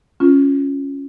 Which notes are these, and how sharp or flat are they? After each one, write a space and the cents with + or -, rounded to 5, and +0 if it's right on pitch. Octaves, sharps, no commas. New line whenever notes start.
C#4 +0 F4 +0